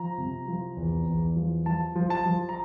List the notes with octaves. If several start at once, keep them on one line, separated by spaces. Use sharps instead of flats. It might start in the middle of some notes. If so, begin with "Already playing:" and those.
Already playing: F3 A#5
C3
F3
E2
E2
F3
F3 A5
F3
A5
F3
A#5